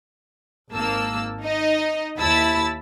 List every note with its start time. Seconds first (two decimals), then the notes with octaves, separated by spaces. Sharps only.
0.72 G#1 A#3 A5 E6
1.42 D#4 D#5
2.17 D#2 E4 A5 B5 E6 A6